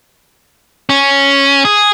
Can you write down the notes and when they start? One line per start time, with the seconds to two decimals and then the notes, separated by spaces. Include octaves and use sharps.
0.90 C#4
1.65 G#4